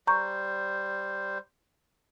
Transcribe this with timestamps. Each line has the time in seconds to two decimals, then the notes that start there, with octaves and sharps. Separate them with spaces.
0.07 G3 C5 A#5 C#6 G6